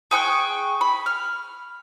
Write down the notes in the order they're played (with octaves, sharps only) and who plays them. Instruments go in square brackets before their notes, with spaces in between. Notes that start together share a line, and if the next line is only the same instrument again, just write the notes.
[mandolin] G#4 G5 C#6 F#6
B5
F6